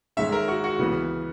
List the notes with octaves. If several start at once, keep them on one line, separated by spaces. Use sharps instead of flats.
G#2 D#3 G#3 C#4 E5
A#4
F#4
F#4
C#2 C#3 E3 B3